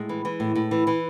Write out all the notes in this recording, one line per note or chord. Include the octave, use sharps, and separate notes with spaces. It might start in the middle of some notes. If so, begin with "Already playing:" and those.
Already playing: A2 G#3
E3
E3
A2
A2
E3
E3